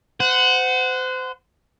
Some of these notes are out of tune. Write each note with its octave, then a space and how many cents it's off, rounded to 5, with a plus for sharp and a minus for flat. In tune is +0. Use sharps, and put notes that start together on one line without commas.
C5 -30 F#5 +0